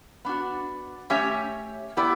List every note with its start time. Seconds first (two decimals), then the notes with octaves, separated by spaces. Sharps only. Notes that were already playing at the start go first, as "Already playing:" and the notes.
0.25 B3 D4 F#4
1.10 A3 C#4 G4 C#5 E5
1.97 B3 E4 G4 D5